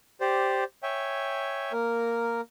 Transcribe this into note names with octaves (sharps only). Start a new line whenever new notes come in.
G4 C5 D5
C#5 E5 G5 G#5
A#3 A#4